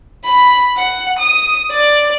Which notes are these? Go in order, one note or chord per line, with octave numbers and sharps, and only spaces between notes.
B5
F#5
D#6
D5